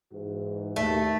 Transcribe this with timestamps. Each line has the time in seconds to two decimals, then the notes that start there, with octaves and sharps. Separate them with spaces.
0.12 G#2 E3 F#4
0.76 D#2 A3